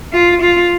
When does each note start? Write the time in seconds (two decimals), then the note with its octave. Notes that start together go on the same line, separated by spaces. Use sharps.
0.13 F4
0.41 F4